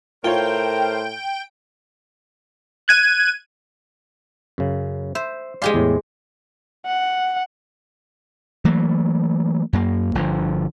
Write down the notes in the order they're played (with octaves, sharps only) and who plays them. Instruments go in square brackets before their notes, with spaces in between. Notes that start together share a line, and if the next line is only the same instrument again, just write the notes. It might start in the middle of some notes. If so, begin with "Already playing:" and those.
[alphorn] A2 [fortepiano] F4 C#5 [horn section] A#4 C5 [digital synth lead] G5
[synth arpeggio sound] F#6 G#6 D#7
[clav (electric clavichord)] F#2 C#3
[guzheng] C5 [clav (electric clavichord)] E5
[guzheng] G#3 G4 C6 [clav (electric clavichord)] D5 F5 G#5
[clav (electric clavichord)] E2 A2
[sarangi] F#5
[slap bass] E3 F#3 A3 A#3
F#2 A#3
G1 D3 F3